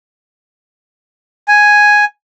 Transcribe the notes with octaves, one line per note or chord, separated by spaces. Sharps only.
G#5